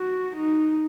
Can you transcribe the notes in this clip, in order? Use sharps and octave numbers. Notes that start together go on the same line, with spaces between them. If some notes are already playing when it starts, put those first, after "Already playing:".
Already playing: F#4
D#4